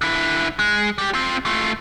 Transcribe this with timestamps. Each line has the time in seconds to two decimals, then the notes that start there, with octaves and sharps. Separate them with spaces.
0.02 D3 E4
0.59 G#3
0.98 G3 G4
1.14 C4 F4
1.46 A3 F4